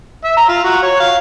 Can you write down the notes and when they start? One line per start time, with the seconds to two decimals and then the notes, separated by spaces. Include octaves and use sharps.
0.25 E5
0.37 A#5
0.49 F4
0.64 F#4
0.83 C#5
1.00 F5